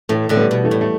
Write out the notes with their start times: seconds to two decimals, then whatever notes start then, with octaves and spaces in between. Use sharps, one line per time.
0.09 A2 E3 A3
0.29 A2 D3 A3
0.36 G3 B3
0.51 B2
0.64 E3 A3
0.71 A2
0.81 A3